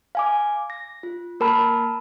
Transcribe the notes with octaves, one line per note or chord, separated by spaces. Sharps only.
F5 G#5 D6
A#6
F4
A#3 A#4 A5 B5 F6